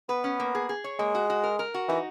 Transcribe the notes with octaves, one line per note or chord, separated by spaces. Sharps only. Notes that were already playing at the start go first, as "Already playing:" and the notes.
B3 B4
C#4
A#3
G#4
G#4
C#5
G#3 A#3
F#4
F#4
A#4
A#4
F#4
E3 D#4